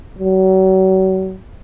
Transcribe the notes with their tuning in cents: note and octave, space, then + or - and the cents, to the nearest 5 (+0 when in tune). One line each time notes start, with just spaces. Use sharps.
F#3 +35